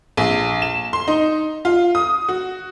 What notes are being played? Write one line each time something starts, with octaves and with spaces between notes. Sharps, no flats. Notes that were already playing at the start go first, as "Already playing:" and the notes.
A#1
E7
C6
D#4
F4
D#6
F#4